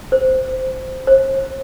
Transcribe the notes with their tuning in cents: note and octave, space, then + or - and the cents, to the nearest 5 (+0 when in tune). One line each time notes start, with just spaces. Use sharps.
C5 -10
C5 +45